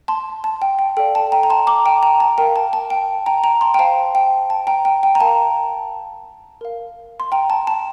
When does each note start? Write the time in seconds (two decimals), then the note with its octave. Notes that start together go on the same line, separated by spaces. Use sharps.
0.08 A5 C6
0.44 A5
0.62 G5
0.79 G5
0.97 A4 D5 F5 G5
1.15 A5
1.32 G5 A#5
1.43 A#5
1.50 A5 C6
1.67 A#5 D6
1.85 G5 A#5
2.03 G5 A#5
2.20 A5
2.38 A#4 F5 G5
2.56 A5
2.73 A5
2.90 G5
3.26 G5 A#5
3.43 G5 A#5
3.61 A5 C6
3.74 G5
3.79 C5 F5 A5
4.15 G5
4.50 A5
4.67 G5 A#5
4.85 G5
5.03 G5
5.15 A#5
5.20 A#4 F5 A5
6.61 A#4 F5
7.20 C6
7.32 G5 A#5
7.50 A5
7.67 A5